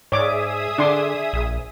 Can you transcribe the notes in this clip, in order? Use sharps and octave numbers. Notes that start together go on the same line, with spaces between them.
G#2 G#4 C#5 D5 E5 D6 D#6
D3 D4 C6 D6
A#1